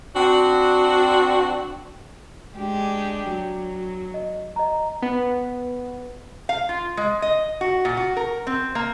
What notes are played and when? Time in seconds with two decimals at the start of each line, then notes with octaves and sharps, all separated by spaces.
0.15 C4 D4 F#4
2.56 G#3 D4 G4
3.30 F#3
4.14 D#5
4.56 D#5 A#5
5.02 B3
6.49 F5
6.69 F4
6.97 G#3
7.22 D#5
7.61 F#4
7.85 A#2
7.97 F#4
8.17 A#4
8.47 C4
8.75 A#3